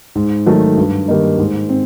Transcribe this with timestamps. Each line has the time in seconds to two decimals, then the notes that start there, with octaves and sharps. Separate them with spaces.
0.15 G#2
0.46 D#3 F#3 A3
0.77 G2
1.08 D#3 G3 A#3 D#4
1.39 G#2
1.69 C4